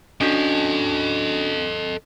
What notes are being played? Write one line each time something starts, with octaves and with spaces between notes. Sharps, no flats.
C#4 D4 F#4 A4 D#5